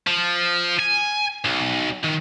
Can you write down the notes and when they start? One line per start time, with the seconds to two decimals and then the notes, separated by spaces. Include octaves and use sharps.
0.07 F3
0.79 G#5
1.45 B1
2.04 D#3